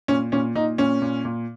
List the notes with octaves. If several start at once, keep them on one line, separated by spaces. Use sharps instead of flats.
A#2 C#4
A#2 C#4
A#2 D#4
A#2 C#4
A#2
A#2